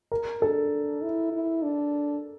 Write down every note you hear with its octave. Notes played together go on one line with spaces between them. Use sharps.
A#4
D4 A4
E4
E4
D4